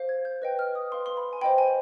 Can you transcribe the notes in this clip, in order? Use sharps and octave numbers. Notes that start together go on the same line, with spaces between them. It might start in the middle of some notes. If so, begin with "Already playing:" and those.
Already playing: C5 F5
G#6
G6
B4 D#5 G5
F6
D#6
B4 F5 C6
C6
B5
G#5
C5 D#5 G5 B5
G#5